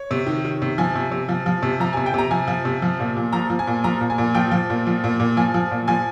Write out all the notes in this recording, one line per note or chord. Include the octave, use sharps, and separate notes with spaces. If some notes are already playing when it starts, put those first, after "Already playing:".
Already playing: C#5
C3
D#3
D#3
C3
F3 G#5
C3
C3
F3
F3
C3
F3 A#5
C3 G#5
G5
C3 A#5
F3 G#5
F3
C3
F3
A#2
A#2
F3 A#5
F3
G#5
A#2
F3 A#5
A#2
G#5
A#2
F3 G5
F3
A#2
F3
A#2
A#2
F3 G#5
F3
A#2
F3 G#5